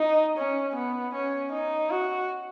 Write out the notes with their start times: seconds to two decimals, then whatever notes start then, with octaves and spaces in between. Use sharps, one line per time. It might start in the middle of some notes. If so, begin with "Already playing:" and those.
Already playing: D#4
0.37 C#4
0.75 B3
1.14 C#4
1.52 D#4
1.90 F#4